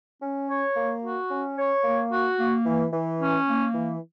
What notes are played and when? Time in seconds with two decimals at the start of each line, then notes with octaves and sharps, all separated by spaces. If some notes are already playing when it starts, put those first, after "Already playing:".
0.21 C#4
0.49 C#5
0.75 A#3
1.03 F#4
1.30 C#4
1.57 C#5
1.84 A#3
2.11 F#4
2.39 A#3
2.65 E3
2.92 E3
3.20 C#4
3.47 A#3
3.74 E3